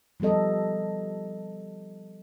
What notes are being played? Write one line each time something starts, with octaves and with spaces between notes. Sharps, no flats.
F3 G3 B3 A4 D#5